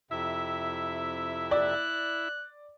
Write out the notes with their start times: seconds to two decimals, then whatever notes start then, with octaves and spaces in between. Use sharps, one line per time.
0.11 F2 C3 E4 E5
1.51 D5 F#6